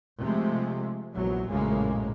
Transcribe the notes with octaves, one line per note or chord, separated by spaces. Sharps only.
C3 F3 G#3 A3
A#1 E2 F#3
A#1 F#2 A2 C#3 G#3 A#3